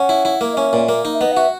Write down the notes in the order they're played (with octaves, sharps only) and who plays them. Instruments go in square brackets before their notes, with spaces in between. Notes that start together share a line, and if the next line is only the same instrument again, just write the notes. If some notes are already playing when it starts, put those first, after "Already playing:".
Already playing: [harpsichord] C#4 [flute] F#5
[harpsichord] E4
E4
A#3
[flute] D#5
[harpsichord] C#4 [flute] E5
[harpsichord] A#2
A#3
D#4
[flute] E5
[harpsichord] B3 [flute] D#5
[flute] F#5
[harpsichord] F#4 [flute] E5